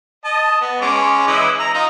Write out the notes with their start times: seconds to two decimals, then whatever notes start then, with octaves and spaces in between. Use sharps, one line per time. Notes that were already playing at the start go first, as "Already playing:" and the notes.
0.25 D#5 A5
0.61 B3
0.81 G#3 C#4 D6
1.27 E3 E4 D#5
1.59 A#5
1.74 D#4 F4 D#5